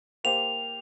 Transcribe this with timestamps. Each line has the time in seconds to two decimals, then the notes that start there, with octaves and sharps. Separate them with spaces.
0.24 A#3 G4 C5 F5 F7